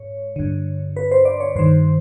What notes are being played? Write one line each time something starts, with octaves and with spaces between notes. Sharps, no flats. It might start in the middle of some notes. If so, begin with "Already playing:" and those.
Already playing: G#2 C#5
G2 D3
B4
C5
D5
C#5
G2 D#3 C5